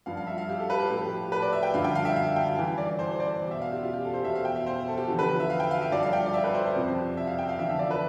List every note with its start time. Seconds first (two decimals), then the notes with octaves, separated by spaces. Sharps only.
0.06 G2 F3 F5
0.17 F5
0.27 E5
0.38 F5
0.49 G4
0.59 A4
0.70 B4
0.80 G4
0.90 A2 F3 G4
1.32 B4
1.42 D5
1.53 E5
1.63 G5
1.74 G2 D3 F3 F5
1.84 G5
1.95 F5
2.05 E5
2.16 F5
2.36 G5
2.57 G2 E3
2.78 D5
2.99 C5
3.11 C5
3.20 D5
3.41 E2 B2
3.51 E5
3.62 F5
3.72 G4
3.82 F4
3.93 G4
4.04 A4
4.14 C5
4.24 E2 B2 E5
4.35 F5
4.45 G5
4.56 E5
4.66 C5
4.88 A4
4.97 G4
5.08 E2 D3 F3
5.19 B4
5.40 E5
5.50 F5
5.60 G5
5.71 F5
5.82 E5
5.92 G2 F3 D5
6.03 F5
6.13 G5
6.26 D5
6.34 E5
6.44 B4
6.54 C5
6.65 C5
6.76 F2 C3 F3
7.17 E5
7.27 F5
7.38 G5
7.49 F5
7.59 E2 D3 F3 E5
7.69 E5
7.79 D5
7.91 B4